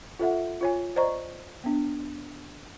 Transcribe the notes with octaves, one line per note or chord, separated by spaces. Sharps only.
F4 A4 E5 F#5
F4 C#5 G#5
C5 D5 D#5 A#5 C#6
B3 D4